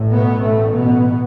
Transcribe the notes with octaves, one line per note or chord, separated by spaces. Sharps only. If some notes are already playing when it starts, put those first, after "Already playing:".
Already playing: A1 A2
B2 B3
A2 A3
B2 B3